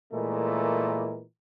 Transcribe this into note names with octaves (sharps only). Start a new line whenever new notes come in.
A#2 E3 G#3 A3 A#4